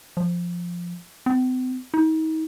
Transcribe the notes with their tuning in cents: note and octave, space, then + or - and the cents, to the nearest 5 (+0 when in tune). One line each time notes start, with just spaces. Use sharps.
F3 +0
C4 -45
D#4 +35